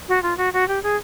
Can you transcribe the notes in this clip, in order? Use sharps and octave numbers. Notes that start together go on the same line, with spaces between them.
F#4
F4
F#4
F#4
G4
G#4